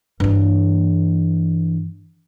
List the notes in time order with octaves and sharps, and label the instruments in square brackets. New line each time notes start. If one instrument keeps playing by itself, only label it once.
[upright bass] G2 E3